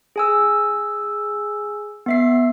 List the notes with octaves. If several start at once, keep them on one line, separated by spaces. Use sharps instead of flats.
G#4 G#5 E6
B3 E5 C7